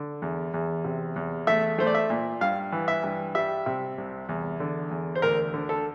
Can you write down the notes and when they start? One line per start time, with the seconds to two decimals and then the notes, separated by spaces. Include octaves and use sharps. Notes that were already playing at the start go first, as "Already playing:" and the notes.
Already playing: D3
0.22 E2
0.54 E2
0.85 C3
1.16 E2
1.47 A3 E5
1.78 A3 C5
1.87 D5
1.95 E5
2.10 A#2
2.41 G2 F5
2.72 E3
2.88 E5
3.04 G2
3.35 G3 E5
3.66 C3
3.98 C2
4.29 E2
4.60 D3
4.91 E2
5.15 C5
5.22 D2 A#4
5.54 D3
5.69 A4